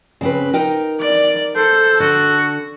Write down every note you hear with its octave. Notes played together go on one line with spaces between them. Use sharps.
C#3 C4 B4
D#4 A#4 G5
D5
A4 C5
D3 F#4